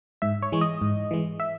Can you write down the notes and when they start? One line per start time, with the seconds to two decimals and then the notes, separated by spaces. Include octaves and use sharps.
0.22 G#2 E5
0.43 C#5
0.52 E3 G#3
0.61 D#5
0.82 G#2
1.11 E3 G#3
1.40 E5